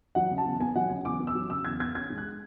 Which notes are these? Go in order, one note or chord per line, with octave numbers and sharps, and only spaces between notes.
F#3 F#5
C#3
A5
E2
B3 G#5
F#3 F#5
C#3 G#5
E2 D6
B3
E6
F#3
C#3 E6
E2 G#6
B3 G#6
C#4 G#6
G#3
F#6